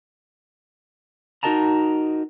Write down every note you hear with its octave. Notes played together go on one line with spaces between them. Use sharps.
D#4 F#4 A#4 D#5 A5 A#5